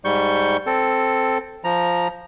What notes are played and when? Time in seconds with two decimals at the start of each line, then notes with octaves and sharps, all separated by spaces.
0.05 G#2 G3 C#6 G6
0.67 C4 A4
1.64 F3 A#5